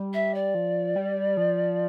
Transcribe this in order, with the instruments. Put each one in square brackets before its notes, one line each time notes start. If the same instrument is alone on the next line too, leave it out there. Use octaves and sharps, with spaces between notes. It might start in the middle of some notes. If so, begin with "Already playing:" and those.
Already playing: [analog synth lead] G3
[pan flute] E5
D5
[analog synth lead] F3
G3
F3